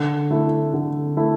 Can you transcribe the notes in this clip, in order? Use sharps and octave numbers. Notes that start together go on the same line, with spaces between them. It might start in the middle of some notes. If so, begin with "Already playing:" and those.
Already playing: D3
A3 E4
D3
A3 E4